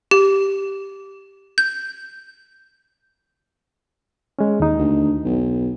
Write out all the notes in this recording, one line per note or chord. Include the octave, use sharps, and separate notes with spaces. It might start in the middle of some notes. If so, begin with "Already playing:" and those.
G4
G6
G#3 C#4
D#2 D#4
D2
B1